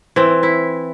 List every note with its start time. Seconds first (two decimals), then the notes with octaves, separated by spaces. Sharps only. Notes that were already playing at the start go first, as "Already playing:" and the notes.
0.16 E3 C4
0.43 E4